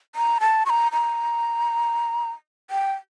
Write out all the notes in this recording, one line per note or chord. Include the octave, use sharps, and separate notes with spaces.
A#5
A5
C#6
A#5
A#5
G5